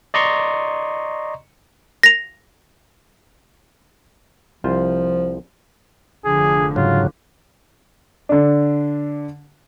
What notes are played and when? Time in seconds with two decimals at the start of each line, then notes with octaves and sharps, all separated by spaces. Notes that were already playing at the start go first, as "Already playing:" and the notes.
0.14 D5 D#5 A#5 C6 C#6
2.03 A#6 F7
4.64 C2 F3 F4 C5
6.25 F1 D3 F3 G#4
6.76 G#2 C#3 F#3 F4
8.29 D3 D4